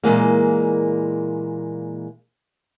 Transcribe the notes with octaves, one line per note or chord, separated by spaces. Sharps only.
A#2 E3 G#3 A#3